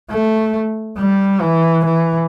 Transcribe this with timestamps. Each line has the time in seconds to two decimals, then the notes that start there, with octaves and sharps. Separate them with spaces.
0.10 A3
0.98 G3
1.41 E3
1.85 E3